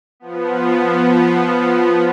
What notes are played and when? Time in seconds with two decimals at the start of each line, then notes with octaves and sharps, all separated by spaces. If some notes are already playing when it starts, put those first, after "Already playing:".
0.20 F3 B3